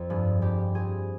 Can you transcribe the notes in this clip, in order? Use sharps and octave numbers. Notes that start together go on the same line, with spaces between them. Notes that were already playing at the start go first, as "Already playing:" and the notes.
Already playing: F2
G2 G#4
G2 G4
C4 G#4